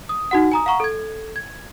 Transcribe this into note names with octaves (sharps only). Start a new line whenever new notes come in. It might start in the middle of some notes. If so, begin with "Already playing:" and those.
D#6
D#4 F#4 F#5
G#5 A#5 D#6
F5 F#5 A#5 C#6
A4 G#6
G#6